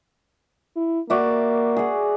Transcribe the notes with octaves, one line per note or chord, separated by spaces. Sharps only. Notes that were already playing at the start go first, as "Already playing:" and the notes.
E4
A#3 F#4 D5 E5
G#4 F#5